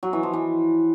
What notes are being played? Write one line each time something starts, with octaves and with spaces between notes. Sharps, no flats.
F#3
E3
F3
E3